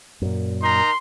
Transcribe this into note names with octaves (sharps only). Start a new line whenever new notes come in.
F#2 A#2
D#4 A#4 A#5 C6